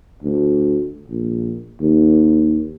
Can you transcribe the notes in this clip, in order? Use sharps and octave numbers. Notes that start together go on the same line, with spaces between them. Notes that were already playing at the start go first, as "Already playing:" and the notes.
D2
A#1
D#2